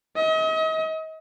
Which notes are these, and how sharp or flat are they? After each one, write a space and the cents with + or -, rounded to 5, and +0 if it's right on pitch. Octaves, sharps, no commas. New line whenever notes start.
D#5 +40